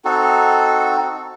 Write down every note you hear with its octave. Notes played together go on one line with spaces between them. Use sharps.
C4 D#4 F#4 A4